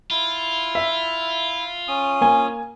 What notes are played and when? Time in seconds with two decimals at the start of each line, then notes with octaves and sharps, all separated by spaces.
0.11 E4 F4
0.75 E5
1.88 C#4 D#6
2.21 A#3 G#5